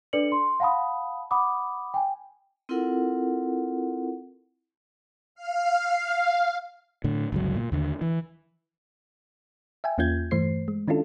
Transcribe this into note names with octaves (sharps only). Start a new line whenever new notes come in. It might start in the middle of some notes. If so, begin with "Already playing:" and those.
D4 A4 B4 D5 C#7 F#7
C6
F5 F#5 A5 B5 D#6
F#5 B5 D6 D#6
G5 G#5
C4 E4 F4 A4 A#4 F#5
F5
A2 D3
G1 C#2 F#3
A#2
D#2 D3
E3
E5 G5 G#5
E2 A#3 C#4 F4 G6 G#6
G2 E3 A3 C5 C7
G#3
D#3 C#4 D4 E4 F4 A4